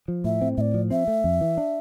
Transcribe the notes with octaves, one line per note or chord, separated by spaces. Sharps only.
F3
A2 E5
C4
A2 D5 E5
F3
C4 E5
A3
F2
E3
D4